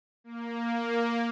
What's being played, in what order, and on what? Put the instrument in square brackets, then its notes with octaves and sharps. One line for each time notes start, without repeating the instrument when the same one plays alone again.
[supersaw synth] A#3